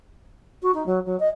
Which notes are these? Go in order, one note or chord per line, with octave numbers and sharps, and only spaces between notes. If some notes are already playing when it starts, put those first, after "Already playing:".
F#4
D#4
F#3
F#3
D#5